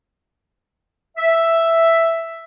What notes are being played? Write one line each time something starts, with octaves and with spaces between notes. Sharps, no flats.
E5